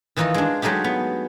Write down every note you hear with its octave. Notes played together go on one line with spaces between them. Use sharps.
D#3 E3 D#4 F4 D#5
G#3 D4
F#3 G#3 A3 D#4 G4
B3